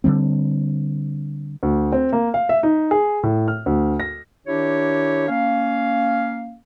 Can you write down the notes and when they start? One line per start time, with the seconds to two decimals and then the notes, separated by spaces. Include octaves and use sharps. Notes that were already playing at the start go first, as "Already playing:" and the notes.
0.04 D3 D#3 G3 C4
1.63 D2
1.92 C4
2.13 A#3
2.34 F5
2.49 E5
2.63 D#4
2.91 G#4
3.23 A2
3.48 F6
3.66 D2
4.00 A#6
4.47 D#3 D4 E4 G4 C#5
5.29 A#3 C#4 F5